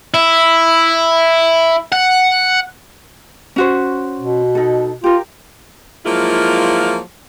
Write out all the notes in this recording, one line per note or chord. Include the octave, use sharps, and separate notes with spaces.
E4
F#5
C#4 F#4 C5
B2
D#4 A4
F4 G4 A#4
F3 F#3 G#3 A#3 E4 F4